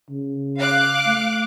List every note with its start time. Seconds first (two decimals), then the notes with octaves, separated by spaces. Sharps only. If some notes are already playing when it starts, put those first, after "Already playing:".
0.10 C#3
0.59 F5 D6 F#6
1.06 A3